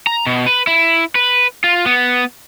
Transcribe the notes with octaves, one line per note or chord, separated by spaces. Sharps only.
A#5
B2
B4
E4
B4
F4
B3